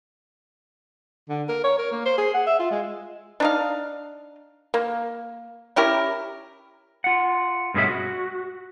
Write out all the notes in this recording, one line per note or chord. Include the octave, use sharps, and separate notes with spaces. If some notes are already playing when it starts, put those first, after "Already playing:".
D3
A#4
C#5
A#4
A#3
C5
G#4
F#5
E5
F4
G#3
D4 D#4 F5
A#3
C#4 E4 G4 A#4
F4 F#5
G2 B2 G#3 C#4 G#4 E5
F#4